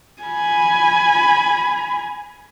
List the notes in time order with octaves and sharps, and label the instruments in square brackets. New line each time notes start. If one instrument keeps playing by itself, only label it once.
[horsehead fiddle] G#5 B5